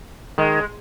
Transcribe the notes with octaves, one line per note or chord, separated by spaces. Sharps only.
D#3 G#3